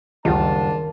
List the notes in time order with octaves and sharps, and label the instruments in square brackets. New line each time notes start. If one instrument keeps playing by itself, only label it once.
[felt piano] F#1 G3 F#5 [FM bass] C#2 [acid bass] D#3 [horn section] D4 F4 A5